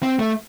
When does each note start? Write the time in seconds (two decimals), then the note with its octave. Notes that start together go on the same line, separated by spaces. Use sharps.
0.03 C4
0.19 A3